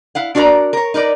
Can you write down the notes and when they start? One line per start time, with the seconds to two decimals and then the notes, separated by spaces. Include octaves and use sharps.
0.15 E4 F5 F#5
0.35 D4 F#4 A#4 D5 A#5
0.73 A#4 C#5
0.94 D#4 A#4 B4 D5